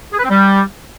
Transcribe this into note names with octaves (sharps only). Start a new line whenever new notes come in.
G#4
B4
C4
G3